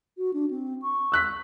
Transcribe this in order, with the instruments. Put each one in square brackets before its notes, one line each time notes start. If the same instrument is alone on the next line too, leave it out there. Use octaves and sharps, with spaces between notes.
[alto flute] F#4
D4
C4
C#6
[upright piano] E6 F#6 B6